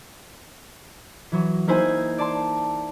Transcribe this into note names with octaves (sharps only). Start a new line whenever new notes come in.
E3 F#3
A#3 D#4 E4 C5 G#5
D5 A5 C6